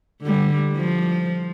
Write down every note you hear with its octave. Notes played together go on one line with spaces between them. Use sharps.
D3 G3
F3